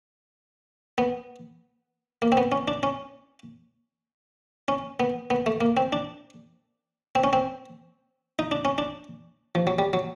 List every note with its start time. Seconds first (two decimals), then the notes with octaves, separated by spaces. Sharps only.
0.98 B3
2.22 A#3
2.32 C4
2.37 B3
2.52 C#4
2.68 D4
2.83 C#4
4.68 C#4
5.00 B3
5.30 B3
5.46 A3
5.61 A#3
5.77 C4
5.93 D4
7.15 C4
7.24 C#4
7.33 C4
8.39 D#4
8.51 D4
8.65 C#4
8.78 D4
9.55 F3
9.67 F#3
9.79 G3
9.93 F#3